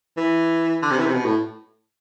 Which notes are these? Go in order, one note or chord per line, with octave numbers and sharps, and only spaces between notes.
E3
D3
C3
E3
C3
B2
A2